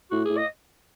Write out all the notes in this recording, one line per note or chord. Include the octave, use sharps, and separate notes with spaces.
A2 F#4
A2 G#4
D#5